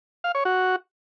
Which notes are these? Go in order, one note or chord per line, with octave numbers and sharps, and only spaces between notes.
F5
C#5
F#4